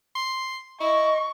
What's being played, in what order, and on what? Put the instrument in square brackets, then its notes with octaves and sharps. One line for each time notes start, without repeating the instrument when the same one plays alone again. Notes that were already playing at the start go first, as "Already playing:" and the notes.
[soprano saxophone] C6
[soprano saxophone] E4 [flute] D#5 [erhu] C#6